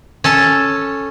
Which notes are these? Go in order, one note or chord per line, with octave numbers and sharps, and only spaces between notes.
C#4 A4 A5